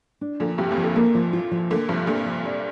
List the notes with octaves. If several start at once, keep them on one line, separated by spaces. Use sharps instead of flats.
D4
A#2 D3 F3
G2 C3 G4
F2 A#2
F3
A#2 D3
A#2 D3 A#3
F3
F4
F3
A#2 D3 A#3
G2 C3 F3
A#2 D3 D4
F3
D4